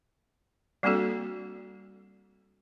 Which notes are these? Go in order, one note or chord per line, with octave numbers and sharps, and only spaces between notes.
G3 A#3 C4 D4 F#4 A4